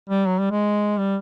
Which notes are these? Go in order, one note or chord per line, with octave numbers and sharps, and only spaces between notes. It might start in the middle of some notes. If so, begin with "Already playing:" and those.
G3
F#3
G3
G#3
G3